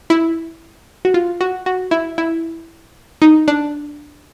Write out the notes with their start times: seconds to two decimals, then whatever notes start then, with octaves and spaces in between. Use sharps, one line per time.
0.10 E4
1.05 F#4
1.14 F4
1.41 F#4
1.66 F#4
1.91 E4
2.18 E4
3.22 D#4
3.48 D4